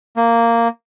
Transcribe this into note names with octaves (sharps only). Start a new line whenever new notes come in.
A#3